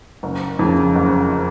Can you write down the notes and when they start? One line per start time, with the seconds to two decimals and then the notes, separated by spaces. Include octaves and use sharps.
0.23 F#1
0.59 F2 C#3
0.95 F#1